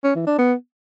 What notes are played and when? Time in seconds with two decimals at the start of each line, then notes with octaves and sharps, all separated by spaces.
0.04 C#4
0.15 E3
0.27 D4
0.38 B3